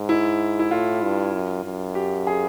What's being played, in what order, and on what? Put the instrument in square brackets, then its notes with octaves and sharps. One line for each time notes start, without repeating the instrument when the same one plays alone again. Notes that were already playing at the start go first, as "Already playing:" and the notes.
Already playing: [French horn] G#2
[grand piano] E4
E4
[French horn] A2 [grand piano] F4
[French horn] G2
F#2
F#2
[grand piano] G4
G#4